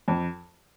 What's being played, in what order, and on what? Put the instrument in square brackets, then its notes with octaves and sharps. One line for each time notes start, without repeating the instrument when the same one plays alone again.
[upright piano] F2